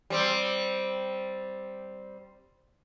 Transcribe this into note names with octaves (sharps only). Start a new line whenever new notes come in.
G3 C4